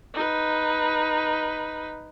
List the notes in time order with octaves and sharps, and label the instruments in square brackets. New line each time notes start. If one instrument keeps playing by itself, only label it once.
[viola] D#4 B4